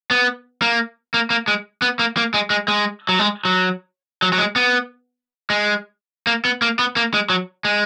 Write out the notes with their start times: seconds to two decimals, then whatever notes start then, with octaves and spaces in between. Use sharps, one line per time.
0.11 B3
0.62 A#3
1.14 A#3
1.30 A#3
1.48 G#3
1.82 B3
1.99 A#3
2.17 A#3
2.34 G#3
2.50 G#3
2.68 G#3
3.09 F#3
3.19 G#3
3.45 F#3
4.22 F#3
4.33 F#3
4.38 G#3
4.56 B3
5.50 G#3
6.27 A#3
6.45 B3
6.62 A#3
6.79 B3
6.96 A#3
7.14 G#3
7.30 F#3
7.65 G#3